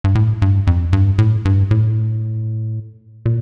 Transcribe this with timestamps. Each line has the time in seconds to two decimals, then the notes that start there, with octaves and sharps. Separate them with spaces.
0.04 G2
0.15 A2
0.42 G2
0.67 F2
0.93 G2
1.18 A2
1.45 G2
1.71 A2
3.26 A#2